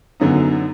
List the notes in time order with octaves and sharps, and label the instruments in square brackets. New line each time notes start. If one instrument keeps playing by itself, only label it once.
[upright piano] F#2 D3 F#3 B3 D#4